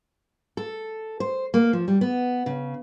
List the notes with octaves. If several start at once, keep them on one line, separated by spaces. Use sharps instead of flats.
A4
C5
A#3
F3
G3
B3
C#3